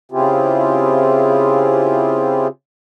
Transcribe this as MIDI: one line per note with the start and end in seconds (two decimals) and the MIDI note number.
0.12 2.47 49
0.12 2.47 60
0.12 2.47 64
0.12 2.47 65
0.12 2.47 67
0.12 2.47 68